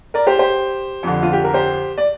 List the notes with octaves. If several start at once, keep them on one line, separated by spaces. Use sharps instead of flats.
A#4 D5
G4 C5
G4 C5
F2 D3
F4
G4
A#4
G4 C5
D5